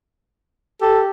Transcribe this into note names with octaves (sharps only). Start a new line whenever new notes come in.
G4 A4